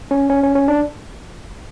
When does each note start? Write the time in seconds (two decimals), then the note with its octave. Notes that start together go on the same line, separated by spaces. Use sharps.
0.11 C#4
0.30 C#4
0.43 C#4
0.55 C#4
0.68 D4